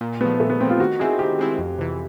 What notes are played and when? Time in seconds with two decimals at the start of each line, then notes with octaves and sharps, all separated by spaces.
0.01 A#2
0.21 F3 A3 B3
0.40 A#2 A3
0.50 B3
0.60 F3 A3 C4
0.70 F4
0.80 D#3 F#4
0.99 G#3 C4 E4 G#4
1.19 D#3 G4
1.39 G#3 C4 E4
1.59 F2
1.78 C3 E3